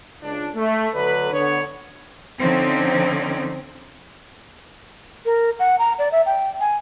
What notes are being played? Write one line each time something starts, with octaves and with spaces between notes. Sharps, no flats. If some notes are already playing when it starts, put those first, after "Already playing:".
C#2 D4
A3
D3 F#3 D4 A4 B4
D3 B3 C#5
D3 F3 C4 C#4 D#4
A#4
F#5
A#5
D5
E5
G5
G#5